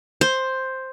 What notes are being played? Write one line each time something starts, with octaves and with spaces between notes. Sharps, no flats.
C5